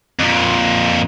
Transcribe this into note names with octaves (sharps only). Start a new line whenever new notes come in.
F2 A#2